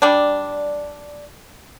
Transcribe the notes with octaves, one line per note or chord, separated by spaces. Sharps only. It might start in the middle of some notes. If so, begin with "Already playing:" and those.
G3 D4